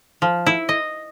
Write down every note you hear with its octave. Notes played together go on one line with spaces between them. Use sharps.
F3
E4
D#5